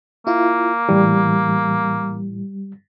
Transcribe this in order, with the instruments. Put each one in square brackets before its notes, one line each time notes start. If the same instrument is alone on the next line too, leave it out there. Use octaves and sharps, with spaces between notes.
[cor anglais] A#3 [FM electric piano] E4 F4
[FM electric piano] A2 E3 [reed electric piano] G3